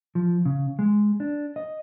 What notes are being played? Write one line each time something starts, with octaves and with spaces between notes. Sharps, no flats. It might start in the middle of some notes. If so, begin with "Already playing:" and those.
F3
C#3
G#3
D4
D#5